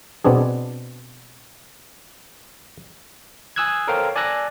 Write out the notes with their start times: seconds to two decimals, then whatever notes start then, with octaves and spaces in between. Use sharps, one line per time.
0.25 B2 B3 C4 D4 G#4
3.56 G#5 D#6 E6 F#6 G#6
3.88 A4 A#4 C5 C#5 F5 G5
4.16 D5 G#5 A5 E6 F#6 A#6